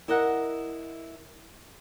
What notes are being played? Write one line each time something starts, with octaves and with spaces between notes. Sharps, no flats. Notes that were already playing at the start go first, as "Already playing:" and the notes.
E4 A#4 D#5 E5 F#5